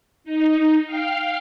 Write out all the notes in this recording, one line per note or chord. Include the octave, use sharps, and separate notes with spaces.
D#4
F5 G5 F6 C7